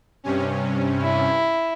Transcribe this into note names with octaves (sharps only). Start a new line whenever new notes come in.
G2 C3 C#4
E4